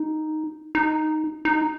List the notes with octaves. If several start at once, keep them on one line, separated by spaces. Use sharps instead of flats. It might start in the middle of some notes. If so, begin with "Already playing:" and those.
Already playing: D#4
D#4
D#4